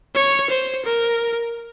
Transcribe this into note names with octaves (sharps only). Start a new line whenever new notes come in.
C#5
C5
A#4